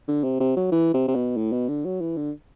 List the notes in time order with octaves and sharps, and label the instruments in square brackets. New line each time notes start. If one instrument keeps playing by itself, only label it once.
[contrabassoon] D3
C3
C3
F#3
E3
C3
C3
B2
A2
B2
D3
F#3
E3
D3